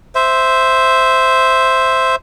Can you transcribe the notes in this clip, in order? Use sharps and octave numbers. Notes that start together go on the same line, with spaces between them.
C5 E5